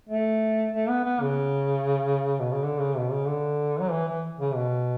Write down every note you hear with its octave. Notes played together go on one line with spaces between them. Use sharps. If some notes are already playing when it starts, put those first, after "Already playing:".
A3
A3
B3
B3
C#3
B2
C#3
D3
C#3
B2
C#3
D3
F#3
E3
E3
C#3
B2